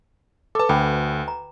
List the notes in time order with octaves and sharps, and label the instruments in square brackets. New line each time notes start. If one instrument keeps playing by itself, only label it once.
[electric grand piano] A4 A5 [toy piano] B4 D6
[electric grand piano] D2 [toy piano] G5 B5
[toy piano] A#5